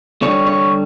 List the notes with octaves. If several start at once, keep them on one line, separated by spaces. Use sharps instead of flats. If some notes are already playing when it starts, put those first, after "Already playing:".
D3 G3 C#5
C#5